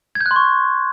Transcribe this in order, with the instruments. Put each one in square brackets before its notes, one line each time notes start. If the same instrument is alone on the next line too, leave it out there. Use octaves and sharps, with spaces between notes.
[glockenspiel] G#6
G6
F#6
C6
C#6